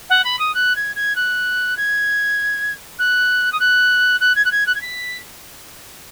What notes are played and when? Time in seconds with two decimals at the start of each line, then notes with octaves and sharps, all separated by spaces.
0.09 F#5
0.24 B5
0.39 D#6
0.54 F#6
0.75 G#6
0.95 G#6
1.15 F#6
1.77 G#6
2.99 F#6
3.52 D#6
3.59 F#6
4.20 F#6
4.35 G#6
4.45 F#6
4.51 G#6
4.66 F#6
4.74 G#6
4.81 B6